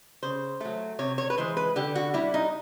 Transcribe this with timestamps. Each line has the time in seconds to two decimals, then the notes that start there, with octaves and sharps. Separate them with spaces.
0.23 C#3 C5
0.61 F#3 A3
0.99 C3 C#5
1.18 C#5
1.30 B4
1.38 E3 G#3 C5
1.57 B4
1.76 D3 G4
1.95 F#4
2.14 G3 E4
2.34 D#4